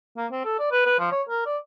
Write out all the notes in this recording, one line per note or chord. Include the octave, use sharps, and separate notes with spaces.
A#3
C4
A4
D5
B4
B4
F3
C#5
A#4
D5